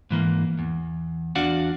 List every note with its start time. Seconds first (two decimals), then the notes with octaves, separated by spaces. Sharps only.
0.11 G#2 E3 A#3
0.59 E2
1.36 E2 D4 F#4 D5 F5 F#5